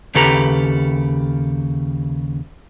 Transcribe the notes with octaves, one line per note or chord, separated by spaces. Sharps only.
D#2 C#3 G4 A4 B4 A#5